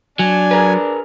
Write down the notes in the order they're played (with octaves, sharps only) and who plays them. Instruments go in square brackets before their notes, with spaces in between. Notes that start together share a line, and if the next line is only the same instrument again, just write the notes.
[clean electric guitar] F#3 [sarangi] D4 [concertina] G#5
[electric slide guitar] G#4 A#4 B4